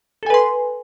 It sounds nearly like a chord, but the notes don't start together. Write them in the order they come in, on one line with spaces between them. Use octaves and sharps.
A4 G#5 B4 C6